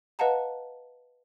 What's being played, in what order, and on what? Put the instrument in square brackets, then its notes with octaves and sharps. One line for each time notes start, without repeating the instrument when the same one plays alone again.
[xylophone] B4 D#5 F5 F#5 A5 A#5